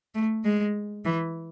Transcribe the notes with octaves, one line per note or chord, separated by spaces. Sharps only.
A3
G#3
E3